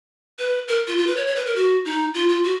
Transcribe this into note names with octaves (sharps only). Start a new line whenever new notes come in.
B4
A#4
F4
F4
B4
C#5
C#5
B4
A#4
F#4
D#4
F4
F4
F#4